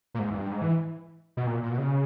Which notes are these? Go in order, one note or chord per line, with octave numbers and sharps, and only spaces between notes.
A#2
G#2
E2
G2
G#2
E3
B2
A#2
A#2
B2
C#3